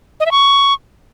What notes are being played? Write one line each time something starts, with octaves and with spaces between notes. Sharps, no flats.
D#5
E5
C#6